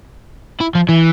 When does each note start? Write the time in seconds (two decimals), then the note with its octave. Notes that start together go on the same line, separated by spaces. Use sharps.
0.61 E4
0.75 F3
0.89 E3